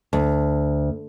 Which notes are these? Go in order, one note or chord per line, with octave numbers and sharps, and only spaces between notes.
D2